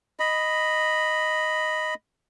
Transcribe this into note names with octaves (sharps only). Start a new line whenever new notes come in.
D#5 B5